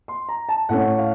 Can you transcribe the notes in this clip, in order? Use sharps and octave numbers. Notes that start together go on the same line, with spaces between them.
C6
A#5
A5
A2 A3 C#4 F#5
F5